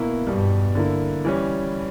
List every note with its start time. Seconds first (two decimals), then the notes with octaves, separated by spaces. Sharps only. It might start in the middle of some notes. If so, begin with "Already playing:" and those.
Already playing: B2 A#3 E4
0.27 E2 G2 B2 G3
0.75 D3 A#3 E4
1.25 E3 G3 C#4